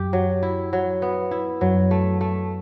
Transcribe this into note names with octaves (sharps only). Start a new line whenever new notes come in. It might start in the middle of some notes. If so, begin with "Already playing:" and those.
Already playing: F#2 G4
F#3
E4
F#3
B3
E4
F#2 F#3
A3
A3